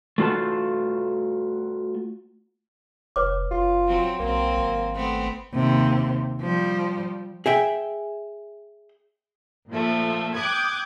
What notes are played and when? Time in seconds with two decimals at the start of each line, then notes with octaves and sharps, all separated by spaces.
0.18 A3 F4 F#4 A5
3.16 F1 B4 C#5 D6
3.51 F#1 F4
3.88 F#3 C4
4.20 B1 F#3 A#3 C4
4.57 G#1
4.95 A3 B3 C4
5.54 D#2 C3
6.41 F3 G3
7.46 G#4 E5 G5
9.71 A#2 F3 A3
10.36 G5 D6 D#6 F#6 G#6